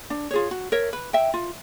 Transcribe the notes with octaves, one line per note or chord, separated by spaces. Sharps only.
D4
F4 G#4 C#5
F#4
A#4 C#5 E5
B4
E5 G5
F4